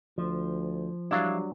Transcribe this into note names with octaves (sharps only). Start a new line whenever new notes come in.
D2 F3
F#3 G3 D4 E4 F5